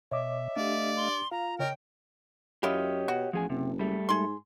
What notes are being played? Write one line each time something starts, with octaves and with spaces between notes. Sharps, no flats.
B2 C#5 D#5 E5 D6
A3 D4 G4 D5 D#5 F5
C6
F4 F5 A#5
C#3 A#4 C#5 D#5 G5
F#2 E4 F4 G4 C#5 D#5
B2 F#4
A1 F3 G#4 G#5
F#1 C3
G3 A3
G#2 G#4 C6